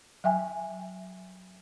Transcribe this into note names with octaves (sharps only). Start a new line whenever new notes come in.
F#3 E5 G5 G#5